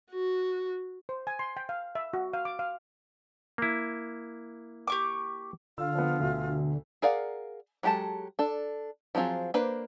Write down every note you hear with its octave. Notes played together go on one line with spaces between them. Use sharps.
F#4
C5
G#5
C6
G5
F5
E5
F#4
F5
D6
F5
A#3 E4
G4 C#6 D6
D3 F4 E6
F3 B3
D2 B2
G#4 A#4 D5 F5 F#5
F#3 G#3 G4 A4 A5
D4 A4
F3 F#3 C4 F4 G#4
A#3 D4 B4 C5